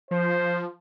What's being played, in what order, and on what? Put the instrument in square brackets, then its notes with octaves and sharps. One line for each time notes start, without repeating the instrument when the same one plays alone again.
[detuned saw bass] F3 [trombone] C5